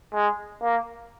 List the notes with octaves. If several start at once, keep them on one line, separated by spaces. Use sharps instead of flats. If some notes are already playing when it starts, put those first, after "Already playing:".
G#3
A#3